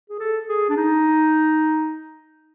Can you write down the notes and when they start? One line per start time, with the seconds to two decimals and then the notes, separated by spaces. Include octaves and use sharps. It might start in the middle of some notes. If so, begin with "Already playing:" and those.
0.10 G#4
0.19 A4
0.49 G#4
0.69 D4
0.77 D#4